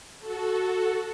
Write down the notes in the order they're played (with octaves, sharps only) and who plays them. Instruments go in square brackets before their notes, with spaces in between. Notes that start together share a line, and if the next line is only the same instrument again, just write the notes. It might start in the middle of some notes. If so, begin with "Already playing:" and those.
[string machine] F#4 A4